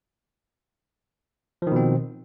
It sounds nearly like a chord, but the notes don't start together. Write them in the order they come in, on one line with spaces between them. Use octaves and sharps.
F3 D#3 B2 C4